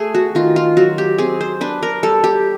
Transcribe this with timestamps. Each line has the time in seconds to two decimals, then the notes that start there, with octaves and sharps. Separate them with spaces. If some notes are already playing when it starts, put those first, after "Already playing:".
Already playing: A3 G#4
0.15 F#4
0.35 D#3 F4
0.56 F4
0.77 F#3 F#4
0.98 G4
1.18 C4 G#4
1.41 C5
1.61 D4 B4
1.83 A#4
2.03 G3 A4
2.24 G4